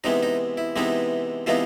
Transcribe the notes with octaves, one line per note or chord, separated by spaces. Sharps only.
C3 E3 G#3 B3 D#4
D#4
E4
C3 E3 G#3 B3 D#4
C3 E3 G#3 B3 D#4 F4